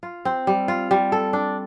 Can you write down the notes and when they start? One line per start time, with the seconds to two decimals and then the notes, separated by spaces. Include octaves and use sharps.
0.03 F4
0.25 C4
0.47 G3
0.68 F4
0.91 G3
1.12 A4
1.33 D4